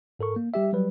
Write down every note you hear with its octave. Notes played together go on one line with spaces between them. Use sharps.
G#2 A4 A#4 C#6
A#3
G3 G4 E5
F#3 G3 B4